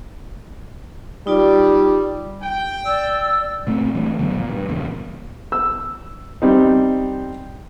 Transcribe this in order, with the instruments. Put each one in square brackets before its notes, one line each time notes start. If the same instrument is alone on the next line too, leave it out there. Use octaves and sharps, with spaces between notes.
[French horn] G3 [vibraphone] D#4 F4 D5
[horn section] G5
[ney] D5 [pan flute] E6
[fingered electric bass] A#2 A3 C4
G2 E3 A3
F#2 D3 F#3 B3
A#2
G2
A#1 E2 A#2 C#3
[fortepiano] E6
G3 C4 D#4